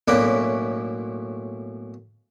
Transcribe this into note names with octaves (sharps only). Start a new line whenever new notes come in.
B1 A2 A#3 C#4 B4 D5